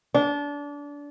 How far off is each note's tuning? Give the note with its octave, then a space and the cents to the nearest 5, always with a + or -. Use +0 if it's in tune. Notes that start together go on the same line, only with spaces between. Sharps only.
D4 -25